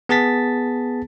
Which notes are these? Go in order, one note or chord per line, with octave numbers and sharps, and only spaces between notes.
B3 G#4 A5 A6 B6